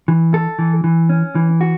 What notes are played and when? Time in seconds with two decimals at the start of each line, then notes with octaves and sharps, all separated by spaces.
0.08 E3
0.34 A4
0.59 E3
0.84 E3
1.09 C#4
1.35 E3
1.61 F#4